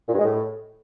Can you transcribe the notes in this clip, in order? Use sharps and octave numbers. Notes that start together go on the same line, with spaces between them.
A#2
G2
G#3
A2